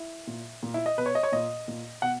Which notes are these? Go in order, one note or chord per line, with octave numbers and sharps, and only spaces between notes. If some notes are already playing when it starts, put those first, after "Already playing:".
Already playing: E4
A#2
A#2
E4
D#5
B2 B4
C#5
D#5
C#5
A#2 D#5
A#2
B2 F#5